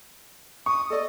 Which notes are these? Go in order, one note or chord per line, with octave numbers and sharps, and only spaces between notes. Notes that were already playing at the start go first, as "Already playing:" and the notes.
C#6 D#6
A4 D5 D#5